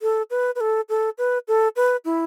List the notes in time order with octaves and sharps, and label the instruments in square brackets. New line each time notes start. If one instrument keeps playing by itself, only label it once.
[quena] A4
B4
B4
A4
A4
B4
A4
B4
E4